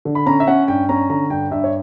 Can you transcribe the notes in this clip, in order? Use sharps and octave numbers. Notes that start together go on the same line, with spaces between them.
D3
B5
C#4 A#5
E5
C#4 F#5
G2 G5
C#4 A#5
D3 A#5
G2 G5
G2 E5
C#5